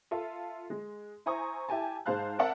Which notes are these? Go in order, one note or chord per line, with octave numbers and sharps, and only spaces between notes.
F4 A4 E5
G#3
E4 C5 G#5 A#5 C#6 D#6
E4 G4 G#5 A5
G#2 G#3 C5 F5 A5 F#6
C4 A#4 D5 E5 F#5 A5